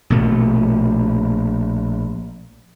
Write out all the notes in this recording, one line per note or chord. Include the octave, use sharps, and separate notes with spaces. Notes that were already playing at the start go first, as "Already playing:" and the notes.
A#1 B2 A3